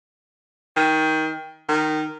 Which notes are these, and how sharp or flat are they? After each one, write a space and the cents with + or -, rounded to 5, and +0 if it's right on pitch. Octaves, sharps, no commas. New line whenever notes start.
D#3 +20
D#3 -10